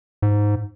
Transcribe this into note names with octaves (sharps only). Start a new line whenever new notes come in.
G#2